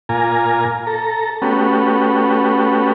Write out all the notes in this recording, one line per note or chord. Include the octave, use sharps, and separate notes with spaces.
A#2 F4 G#5 A#5
A4 A#5
A3 B3 C#4 F#4 G4